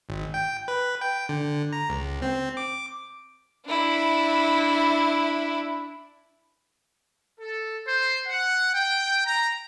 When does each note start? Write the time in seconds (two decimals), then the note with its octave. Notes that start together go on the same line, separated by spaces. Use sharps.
0.09 G#1
0.34 G5
0.68 B4
1.01 G5
1.29 D3
1.73 A#5
1.89 C#2
2.22 C4
2.57 D6
3.67 D4 E4
7.40 A4
7.86 C5
8.27 F#5
8.74 G5
9.25 A#5